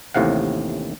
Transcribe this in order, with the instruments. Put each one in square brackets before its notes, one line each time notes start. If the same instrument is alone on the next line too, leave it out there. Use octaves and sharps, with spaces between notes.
[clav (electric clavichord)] A1 D#2 A2 C3 F5 F#5